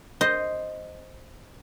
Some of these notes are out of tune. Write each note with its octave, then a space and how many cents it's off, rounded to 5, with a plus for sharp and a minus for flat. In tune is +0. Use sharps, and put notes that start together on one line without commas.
C5 +0 D#5 +0